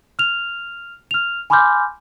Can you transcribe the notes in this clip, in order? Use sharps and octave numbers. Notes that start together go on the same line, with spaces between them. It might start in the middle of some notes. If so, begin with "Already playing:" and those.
F6 F7
F6 F7
G#5 B5 C6 D6 F6 G6